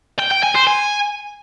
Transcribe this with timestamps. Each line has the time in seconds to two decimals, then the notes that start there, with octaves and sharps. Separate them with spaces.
0.19 G5
0.31 G5
0.43 G#5
0.55 C5
0.67 G#5